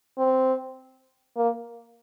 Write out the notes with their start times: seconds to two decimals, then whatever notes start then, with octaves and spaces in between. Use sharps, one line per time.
0.18 C4
1.37 A#3